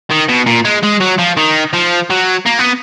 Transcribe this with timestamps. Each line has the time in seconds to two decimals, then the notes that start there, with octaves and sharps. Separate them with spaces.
0.10 D#3
0.28 B2
0.47 A#2
0.65 G#3
0.83 G#3
1.01 F#3
1.19 F3
1.37 D#3
1.73 F3
2.10 F#3
2.46 A#3
2.59 B3